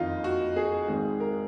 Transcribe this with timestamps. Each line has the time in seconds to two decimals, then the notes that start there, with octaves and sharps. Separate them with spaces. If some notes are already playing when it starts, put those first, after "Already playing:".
Already playing: F#1 F2 D#3 D#4 F4
0.24 F#4
0.56 G#4
0.88 G#1 G#2 D#3
1.20 A#4